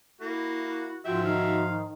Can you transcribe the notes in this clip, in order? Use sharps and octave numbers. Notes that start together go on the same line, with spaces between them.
A#3 E4 F#4
G#2 F3 F#3 F4 E5 G5
D#3 F5